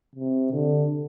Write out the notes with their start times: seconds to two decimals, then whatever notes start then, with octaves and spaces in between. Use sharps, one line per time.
0.16 C3
0.52 D3